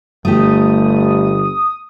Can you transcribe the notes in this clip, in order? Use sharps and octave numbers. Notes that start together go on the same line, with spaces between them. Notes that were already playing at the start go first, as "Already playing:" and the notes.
G1 A3 G4 D#6